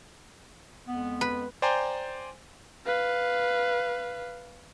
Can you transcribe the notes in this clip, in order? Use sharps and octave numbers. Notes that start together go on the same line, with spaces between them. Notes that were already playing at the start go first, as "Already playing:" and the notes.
F2 G#3 B3
B4
C5 D5 G5 G#5 A#5 C6
B4 F5